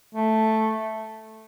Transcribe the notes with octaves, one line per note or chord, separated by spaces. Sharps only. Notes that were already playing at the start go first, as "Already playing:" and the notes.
A3